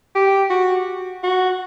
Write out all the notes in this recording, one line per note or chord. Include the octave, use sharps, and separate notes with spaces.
G4
F#4
F#4